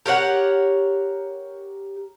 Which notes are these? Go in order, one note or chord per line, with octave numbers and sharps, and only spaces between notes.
G4 A#4 C#5 F#5